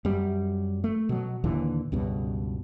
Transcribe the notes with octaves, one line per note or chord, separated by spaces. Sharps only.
F#2 G3
A3
B2 F#3
D#2 A#2 D3 E3
C#2 G2 B2